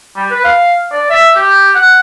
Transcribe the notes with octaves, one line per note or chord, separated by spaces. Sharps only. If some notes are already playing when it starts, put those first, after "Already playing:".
G3
B4
F5
D5
E5
G4
F#5